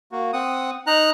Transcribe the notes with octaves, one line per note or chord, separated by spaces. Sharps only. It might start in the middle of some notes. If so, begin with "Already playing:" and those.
A#3 F#4
C4 F#5 D#6
D#4 A#5 F#6